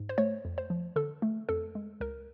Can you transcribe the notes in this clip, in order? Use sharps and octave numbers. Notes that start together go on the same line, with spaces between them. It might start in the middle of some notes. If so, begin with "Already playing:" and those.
Already playing: G#2
C5
A3 C#5
F2
C5
F3
D3 A4
A3
F2 A4
G#3
C#2 A#4